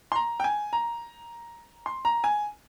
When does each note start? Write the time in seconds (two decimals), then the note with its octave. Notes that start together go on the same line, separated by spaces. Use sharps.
0.12 C6
0.16 A#5
0.40 G5
0.44 G#5
0.73 A#5
1.86 C6
2.05 A#5
2.24 G#5